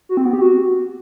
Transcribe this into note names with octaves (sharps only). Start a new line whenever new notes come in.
F#4
C4
B3
G4
F#4